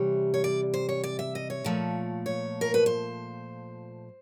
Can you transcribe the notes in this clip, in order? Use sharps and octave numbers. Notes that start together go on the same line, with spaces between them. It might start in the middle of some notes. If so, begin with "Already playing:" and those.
Already playing: C3 E3 G3 C#5
C#5
D5
C5
C#5
D5
E5
D#5
C#5
A#2 F3 A3
C#5
A#4
B4
C5